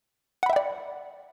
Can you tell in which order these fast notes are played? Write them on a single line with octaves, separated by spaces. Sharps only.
F#5 B5 E5 G5 D5